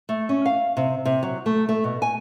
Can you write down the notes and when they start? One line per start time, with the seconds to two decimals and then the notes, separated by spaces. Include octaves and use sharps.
0.09 A3
0.29 C#4
0.46 F5
0.77 C3
1.05 C3
1.23 F#3
1.46 A3
1.69 A3
1.84 B2
2.02 G#5